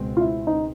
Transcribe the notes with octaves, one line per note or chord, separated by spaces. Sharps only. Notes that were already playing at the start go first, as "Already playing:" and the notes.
Already playing: C#2 B2 G#3 C4
F4
E4
D#4